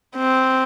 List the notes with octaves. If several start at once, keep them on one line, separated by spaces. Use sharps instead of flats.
C4